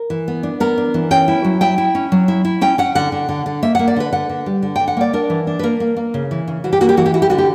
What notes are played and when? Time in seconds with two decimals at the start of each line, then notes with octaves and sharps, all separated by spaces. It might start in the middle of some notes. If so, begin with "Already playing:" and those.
Already playing: A#4
0.10 E3
0.28 B3
0.43 D4
0.60 B3 A#4
0.78 D4
0.94 E3
1.11 C#4 G5
1.28 E4
1.44 F#3
1.61 E4 G5
1.78 E4
1.95 C#4
2.12 F#3
2.28 E4
2.45 E4
2.61 C#4 G5
2.78 C#4 F#5
2.95 D3 F#5
3.12 D3
3.29 D3
3.46 D3
3.63 A#3 E5
3.75 A#3 F#5
3.88 D5
3.96 D3 B4
4.13 D3 F#5
4.29 D3
4.46 G3
4.63 D3
4.76 D3 G5
4.88 F#5
4.97 A#3 D5
5.13 D4 A#4
5.30 E3
5.47 D4
5.59 B4
5.63 A#3 A#4
5.80 A#3
5.97 A#3
6.14 C#3
6.31 E3
6.48 C#3
6.64 E3 F#4
6.73 G4
6.81 A#3 F#4
6.89 G4
6.97 E3 F#4
7.06 G4
7.14 E4 F#4
7.22 G4
7.30 D3 F#4
7.38 G4